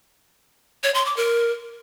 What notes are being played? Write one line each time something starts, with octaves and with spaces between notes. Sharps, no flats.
C#5
C6
D6
A#4